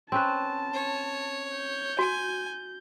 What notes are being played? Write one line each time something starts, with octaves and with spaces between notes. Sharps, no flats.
C4 C#4 B4 A5
C#5
G6
F#4 G#5